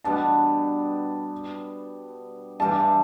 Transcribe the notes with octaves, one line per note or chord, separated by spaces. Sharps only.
B2 G3 B3 D4 A5
G2 E3 G3 D4 A5